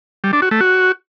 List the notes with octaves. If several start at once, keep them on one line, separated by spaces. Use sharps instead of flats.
G3
D4
F#4
A3
F#4